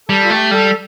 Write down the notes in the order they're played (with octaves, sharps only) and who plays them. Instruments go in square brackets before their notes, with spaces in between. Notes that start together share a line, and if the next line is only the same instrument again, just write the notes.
[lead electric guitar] G3 [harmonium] A4
[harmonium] F4
[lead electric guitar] A3 [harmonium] G4
[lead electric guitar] G3 [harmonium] A4